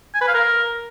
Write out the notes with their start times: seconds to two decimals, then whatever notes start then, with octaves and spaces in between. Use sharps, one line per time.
0.15 G#5
0.21 B4
0.28 F5
0.35 A#4